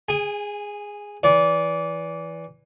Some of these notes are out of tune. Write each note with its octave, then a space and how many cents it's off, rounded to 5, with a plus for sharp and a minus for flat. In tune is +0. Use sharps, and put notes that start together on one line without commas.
G#4 -10 G#5 -40
E3 +0 D5 -25